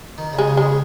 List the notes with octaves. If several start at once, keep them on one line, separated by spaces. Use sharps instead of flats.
D#3
C#3
G#3
C#3
G#3
C#3